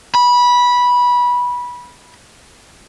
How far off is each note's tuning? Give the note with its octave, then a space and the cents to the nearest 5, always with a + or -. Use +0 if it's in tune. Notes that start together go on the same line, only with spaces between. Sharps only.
B5 -15